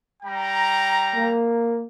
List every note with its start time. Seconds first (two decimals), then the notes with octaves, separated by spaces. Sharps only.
0.23 G3 G5 A#5
1.15 A#3